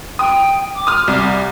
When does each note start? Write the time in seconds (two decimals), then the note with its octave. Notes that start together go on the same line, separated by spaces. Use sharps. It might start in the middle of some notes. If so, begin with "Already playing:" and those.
0.19 G5 D#6
0.75 D6
0.87 D#6 F6
1.08 C2